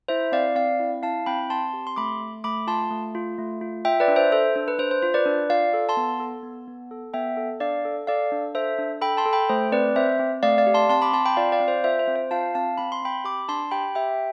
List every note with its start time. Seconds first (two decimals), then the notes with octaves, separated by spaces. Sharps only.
0.08 E4 C5 E5
0.32 C4 D5 F5
0.55 C4 D5 F5
0.80 E4
1.03 E4 F5 A5
1.26 C4 G5 B5
1.50 C4 A5 C6
1.73 G4
1.87 C6
1.96 A3 B5 D6
2.20 A3
2.44 A3 B5 D6
2.67 F4 A5 C6
2.90 A3
3.15 F4
3.38 A3
3.61 F4
3.85 F4 E5 G5
4.00 B4 D5
4.08 D4
4.16 C5 E5
4.32 A4 C5
4.56 D4
4.68 B4
4.78 D4 C5
4.91 C5
5.02 F4 C5
5.14 B4 D5
5.26 D4
5.50 F4 D5 F5
5.74 A4
5.89 A5 C6
5.97 B3
6.20 A4
6.43 B3
6.68 B3
6.91 A4
7.14 B3 E5 G5
7.37 A4
7.60 D4 D5 F5
7.85 A4
8.07 A4 D5 F5
8.32 D4
8.55 A4 C5 E5
8.79 D4
9.01 A4 G5 B5
9.17 A5 C6
9.26 A4
9.33 G5 B5
9.49 A3 C5
9.72 C4 B4 D5
9.96 C4 C5 E5
10.19 C4
10.43 A3 D5 F5
10.58 D5 F5
10.67 G4
10.74 A5 C6
10.89 C4 A5 C6
11.02 B5 D6
11.13 C4 A5 C6
11.26 G5 B5
11.37 F4 D5 F5
11.52 D5 F5
11.60 C4
11.68 C5
11.84 F4 C5 E5
11.99 C5
12.07 C4
12.16 C5
12.31 F4 F5 A5
12.54 C4 F5 A5
12.78 C4 B5
12.92 C6
13.02 C4 G5 B5
13.24 G4 B5 D6
13.48 D4 A5 C6
13.71 G4 G5 B5
13.95 G4 E5 G5